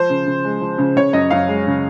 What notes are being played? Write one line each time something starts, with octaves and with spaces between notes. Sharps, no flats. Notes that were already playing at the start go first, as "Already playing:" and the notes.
Already playing: F3 C5
C#3
C#3
G#3
F3
C#3
C#3 C#5
F#2 D#5
F#2 F5
G#3
C#3